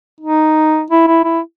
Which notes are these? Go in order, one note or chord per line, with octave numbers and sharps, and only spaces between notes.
D#4
E4
E4
E4